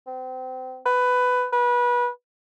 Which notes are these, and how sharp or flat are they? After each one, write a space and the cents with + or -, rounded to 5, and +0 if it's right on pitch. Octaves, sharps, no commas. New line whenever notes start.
C4 -30
B4 +15
B4 -25